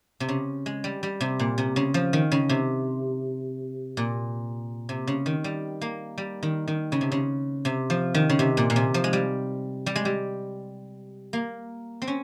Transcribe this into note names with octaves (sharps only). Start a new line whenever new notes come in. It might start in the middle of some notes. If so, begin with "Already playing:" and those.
C3
C#3
G#3
G3
G3
C3
A#2
C3
C#3
F3
D#3
C#3
C3
A#2
C3
C#3
D#3
G3
A#3
G3
D#3
D#3
C#3
C3
C#3
C3
F3
D#3
C#3
C3
A#2
A#2
C3
F3
G#3
G3
G3
G#3
G3
A#3
C4
C#4